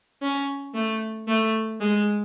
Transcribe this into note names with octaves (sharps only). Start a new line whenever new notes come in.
C#4
A3
A3
G#3